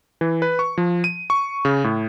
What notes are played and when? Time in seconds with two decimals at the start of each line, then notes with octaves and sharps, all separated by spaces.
0.21 E3
0.42 B4
0.59 C#6
0.78 F3
1.04 D#7
1.30 C#6
1.65 C#3
1.84 A2